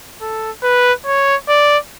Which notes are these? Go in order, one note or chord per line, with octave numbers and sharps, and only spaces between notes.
A4
B4
C#5
D5